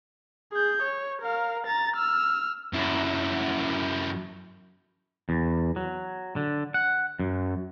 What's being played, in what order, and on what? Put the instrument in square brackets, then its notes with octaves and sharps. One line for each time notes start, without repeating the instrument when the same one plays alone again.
[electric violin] G#4 G6
C#5
A#4 F5
A#5 A6
E6 F6
[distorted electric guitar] F#2 E4
[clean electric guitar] E2
F#3
D3
F#5
F#2